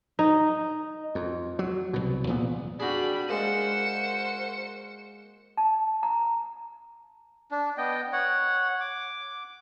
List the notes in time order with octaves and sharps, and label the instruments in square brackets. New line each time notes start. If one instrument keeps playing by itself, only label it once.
[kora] D#4
[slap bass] F2
F#3
C2 B2
E2 A#2 B3
[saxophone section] F2 G3 D4 [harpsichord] F#4 G#4 [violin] B5
[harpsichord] G#3 A#3 [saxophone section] F#4 A#4 C5 [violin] C#7 E7
[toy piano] A5
A#5
[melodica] D4
B3 D#5 G5
C#5 F#5
D6